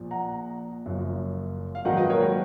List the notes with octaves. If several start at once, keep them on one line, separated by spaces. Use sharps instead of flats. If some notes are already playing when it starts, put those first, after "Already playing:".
Already playing: A#1 A#2 F3
F#5 A#5
F#1 F#2 F3
F5
A#1 G#2 D#3 F#3 D#5 F#5
B4 D#5
A#4 C#5
F#4